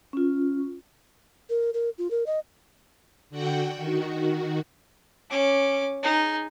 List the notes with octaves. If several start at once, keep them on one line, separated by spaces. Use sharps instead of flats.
C#4 F4
A#4
A#4
F4
A#4
D#5
D3 F#4 F#5 G5
D#3 F#4
C#4 D6
D#4 G#4